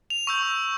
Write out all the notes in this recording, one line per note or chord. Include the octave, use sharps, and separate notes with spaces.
F7
C#6 E6 G6